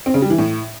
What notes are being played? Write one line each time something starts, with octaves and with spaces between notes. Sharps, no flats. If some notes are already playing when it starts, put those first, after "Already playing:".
C4
C#3
G3
E3
A2